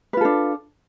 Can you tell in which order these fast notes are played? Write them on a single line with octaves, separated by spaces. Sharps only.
B4 F4 A4 D4